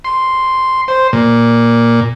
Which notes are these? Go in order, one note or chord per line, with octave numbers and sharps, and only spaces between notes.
C6
C5
A#2